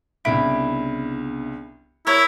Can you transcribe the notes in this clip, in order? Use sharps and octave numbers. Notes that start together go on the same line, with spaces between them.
C2 C#3 B3 D4 E4 D7
E4 A#4 C#5